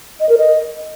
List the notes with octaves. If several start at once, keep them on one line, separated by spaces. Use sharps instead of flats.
D#5
A#4
D#5